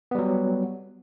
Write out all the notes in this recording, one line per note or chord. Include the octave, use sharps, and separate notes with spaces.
F#3 G3 B3